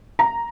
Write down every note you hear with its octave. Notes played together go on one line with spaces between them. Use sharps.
A#5